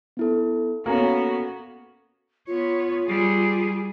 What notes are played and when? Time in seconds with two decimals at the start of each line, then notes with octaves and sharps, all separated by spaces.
0.17 B3 E4 A4
0.86 A#3 B3 C#4 F#4 A4
2.47 B3 F4 C#5
3.07 G3 G#4